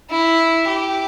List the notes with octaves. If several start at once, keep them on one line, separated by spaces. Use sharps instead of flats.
E4
G4